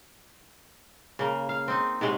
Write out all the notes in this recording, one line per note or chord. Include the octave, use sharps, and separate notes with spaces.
C#3 A#3
F5
C4 D#4
G#2 C3 G#3 C#4